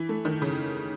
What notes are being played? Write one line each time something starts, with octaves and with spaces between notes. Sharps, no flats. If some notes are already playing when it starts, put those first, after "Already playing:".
Already playing: E3
A3
D#3
C#3